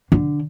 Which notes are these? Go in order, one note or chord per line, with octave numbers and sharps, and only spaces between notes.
D3